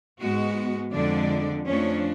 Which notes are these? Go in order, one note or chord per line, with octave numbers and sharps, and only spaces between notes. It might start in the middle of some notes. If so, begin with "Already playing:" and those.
G#2 G#3 B3 F#4
F2 D3 F3 G#3 D4 D5
F2 F3 A3 C#4 D4 C#5